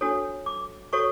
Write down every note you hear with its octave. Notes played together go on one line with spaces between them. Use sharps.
D4 F#4 A4 C#5
D6
F#4 A4 C#5 C#6